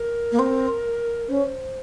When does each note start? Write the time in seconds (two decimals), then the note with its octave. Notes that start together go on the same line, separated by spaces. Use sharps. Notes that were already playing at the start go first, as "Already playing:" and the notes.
Already playing: A#4
0.32 A#3
0.39 C4
1.28 C#4 C5